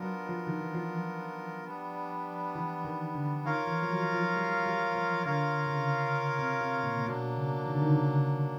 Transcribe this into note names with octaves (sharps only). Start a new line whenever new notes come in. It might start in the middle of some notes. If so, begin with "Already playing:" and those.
Already playing: F#3 B3 D4 F4 A#4
F3
D#3
E3
F3
G3 B3 D4
E3
D#3
D3
D#3 F4 A#4 C#5 F5
E3
F3
F#3
F3
G3
G3
F3
D3 F4 A#4 C#5 F5
D3
C#3
C3
C3
A#2
B2 F#3 A#3 D4
C#3
D#3
D3
D#3
C#3